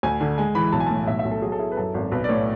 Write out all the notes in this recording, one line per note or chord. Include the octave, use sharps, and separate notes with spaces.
D2 G#5
D3
G#3 G#5
E3 B5
B1 A5
G#5
A2 A5
B1 E5
E5
B1
A4
F#3 G#4
A4
E4 G#4
B4
F#2 A4
G#1
B1 B4
D5
A2 C#5